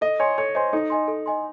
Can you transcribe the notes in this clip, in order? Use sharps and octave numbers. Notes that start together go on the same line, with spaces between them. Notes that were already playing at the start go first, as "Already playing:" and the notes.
A4 D#5
C#5 D#5 G#5 C6
A4 C#5
C5 D#5 G#5 C6
D#4 A4
D#5 G#5 C6
A4
D#5 G#5 C6